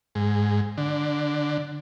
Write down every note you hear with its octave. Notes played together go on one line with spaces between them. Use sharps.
G#2
D3